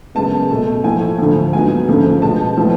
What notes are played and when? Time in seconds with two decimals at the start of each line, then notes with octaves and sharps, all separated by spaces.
0.15 F#2 C#3 G#3 B3 A5
0.50 B2 A3
0.84 A2 F3 A3 G#5
1.18 D2 D3 F3
1.53 G#2 F#3 B3 G#5
1.88 D2 C#3 F3 A3
2.22 B2 G#3 B3 A5
2.57 A2 F3 G#3 B3